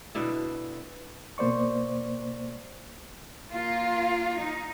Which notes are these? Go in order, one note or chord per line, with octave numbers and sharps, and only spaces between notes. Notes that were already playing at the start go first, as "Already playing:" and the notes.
B2 D3 E4
B2 A#3 C5 D5 C#6
A#3 F4
D#4